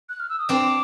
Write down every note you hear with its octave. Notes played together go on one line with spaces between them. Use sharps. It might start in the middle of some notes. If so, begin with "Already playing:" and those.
F#6
F6
E6
D#6
C4 D4 D6